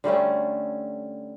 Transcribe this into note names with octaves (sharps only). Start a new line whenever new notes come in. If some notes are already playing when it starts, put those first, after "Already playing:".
D3 G3 A3 C#4